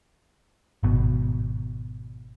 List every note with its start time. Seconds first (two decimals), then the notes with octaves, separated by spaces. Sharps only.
0.83 G#1 B2